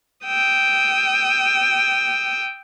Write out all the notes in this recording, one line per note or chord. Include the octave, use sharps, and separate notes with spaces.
G5 D#6 E6